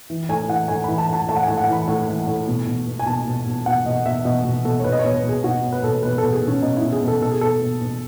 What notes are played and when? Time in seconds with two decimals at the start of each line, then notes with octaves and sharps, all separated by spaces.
0.10 E3
0.29 A2 G#5
0.49 E3 F#5
0.68 A2 G#5
0.84 E3 B5
0.98 A5
1.08 A2 A5
1.28 A2 A5
1.36 F#5
1.43 A2 G#5
1.58 F#5
1.68 E3 B5
1.87 A2
2.08 E3
2.27 A2
2.47 B2
2.67 B2
2.87 B2
3.00 G#5
3.06 B2 A5
3.26 B2
3.46 B2
3.66 B2 F#5
3.85 B2 D#5
4.05 B2 E5
4.25 B2 D#5
4.44 B2
4.64 B2 A4
4.80 C#5
4.84 B2 B4
4.92 D#5
4.99 C#5
5.04 B2
5.14 B4
5.23 B2
5.29 G#4
5.44 B2 F#4
5.63 B2
5.72 B4
5.83 B2 A4
6.03 B2 B4
6.18 A4
6.23 B2
6.33 G#4
6.43 B2 C#4
6.62 B2 D#4
6.77 E4
6.82 B2
6.92 G#4
7.02 B2
7.08 A4
7.22 B2 A4
7.32 G#4
7.41 B2 A4
7.61 B2
7.81 B2